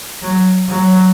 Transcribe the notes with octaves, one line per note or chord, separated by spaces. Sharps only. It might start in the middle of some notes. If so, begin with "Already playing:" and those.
F#3
F#3